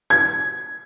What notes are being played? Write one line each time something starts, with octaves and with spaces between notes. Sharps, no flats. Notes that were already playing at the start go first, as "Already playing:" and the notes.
G#6